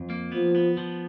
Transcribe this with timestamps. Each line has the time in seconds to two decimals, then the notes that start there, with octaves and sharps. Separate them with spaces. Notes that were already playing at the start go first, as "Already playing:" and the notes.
Already playing: F2
0.10 A#3
0.32 F3 B3
0.55 B3
0.77 F3